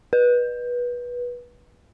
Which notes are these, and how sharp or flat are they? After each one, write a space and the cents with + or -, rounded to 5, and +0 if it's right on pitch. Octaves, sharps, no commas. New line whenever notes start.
B4 -20